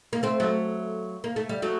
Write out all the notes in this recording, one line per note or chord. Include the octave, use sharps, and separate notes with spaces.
A#3
A3 C4
F#3 A3
A#3
A3
G3
F#3 A3